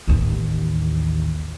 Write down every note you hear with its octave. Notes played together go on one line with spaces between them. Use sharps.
A1 D#2